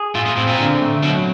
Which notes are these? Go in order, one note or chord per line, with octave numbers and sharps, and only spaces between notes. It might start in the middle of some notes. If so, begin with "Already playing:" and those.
Already playing: G#4
A2 F4
A#2
A2 C4
A#2
D3
A3
B2 F#3